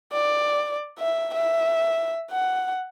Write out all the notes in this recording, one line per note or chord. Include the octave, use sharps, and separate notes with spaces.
D5
E5
E5
F#5